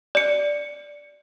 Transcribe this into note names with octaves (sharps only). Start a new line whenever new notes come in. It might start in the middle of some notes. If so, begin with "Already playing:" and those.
D5 C#7